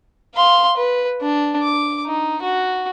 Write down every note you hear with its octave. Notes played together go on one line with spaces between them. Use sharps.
F5 C6
B4
D4
D6
D#4
F#4